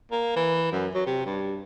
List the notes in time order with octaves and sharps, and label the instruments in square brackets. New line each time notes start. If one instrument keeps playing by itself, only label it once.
[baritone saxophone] A#3
E3
F#2
F#3
C3
G2